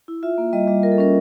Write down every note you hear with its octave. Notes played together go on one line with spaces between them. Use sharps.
E4
F4 E5
A#3
G3 D#5
G3
F4 A#4
A4
C#4 A#4